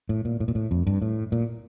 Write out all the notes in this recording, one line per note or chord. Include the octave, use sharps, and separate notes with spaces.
A2
A#2
A2
A#2
A2
F2
G2
A2
A#2